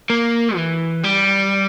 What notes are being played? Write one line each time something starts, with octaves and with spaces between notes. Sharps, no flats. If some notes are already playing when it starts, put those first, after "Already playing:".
A#3
E3
G3